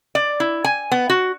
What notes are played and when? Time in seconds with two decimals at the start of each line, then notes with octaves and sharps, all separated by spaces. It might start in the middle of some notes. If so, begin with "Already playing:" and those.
0.15 D5
0.40 E4
0.64 G#5
0.92 B3
1.09 F#4